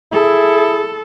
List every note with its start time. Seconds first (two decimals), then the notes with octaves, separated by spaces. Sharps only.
0.12 E4 G#4 A4